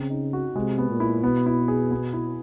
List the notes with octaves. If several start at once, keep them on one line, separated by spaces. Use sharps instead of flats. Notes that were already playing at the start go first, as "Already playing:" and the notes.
Already playing: C#3 C4
D#4
F#4
C3 G#3
B3
A#2
E4
B2 B3
E4
G#4
B3
E4